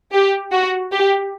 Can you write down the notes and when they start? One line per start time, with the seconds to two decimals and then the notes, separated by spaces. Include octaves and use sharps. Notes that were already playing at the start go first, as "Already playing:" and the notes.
0.13 G4
0.52 F#4
0.92 G4